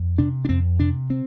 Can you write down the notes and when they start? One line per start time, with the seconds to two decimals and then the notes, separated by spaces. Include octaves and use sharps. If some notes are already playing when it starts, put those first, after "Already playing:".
Already playing: F2
0.18 C3 D4
0.45 D4
0.49 F2 C4
0.79 C3 D4
1.10 C4